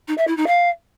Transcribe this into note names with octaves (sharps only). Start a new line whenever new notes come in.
D#4
E5
E4
D#4
F5